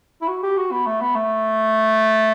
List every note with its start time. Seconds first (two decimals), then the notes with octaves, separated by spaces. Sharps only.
0.22 E4
0.28 F#4
0.43 G4
0.57 F#4
0.72 B3
0.86 A3
1.01 B3
1.15 A3